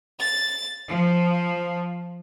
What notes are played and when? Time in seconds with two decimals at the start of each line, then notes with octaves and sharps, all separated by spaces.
0.19 A6
0.87 F3